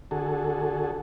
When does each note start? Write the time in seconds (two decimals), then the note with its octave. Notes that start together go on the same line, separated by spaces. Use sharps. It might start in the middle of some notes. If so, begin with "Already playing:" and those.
0.11 D3 F#4 G#4 A4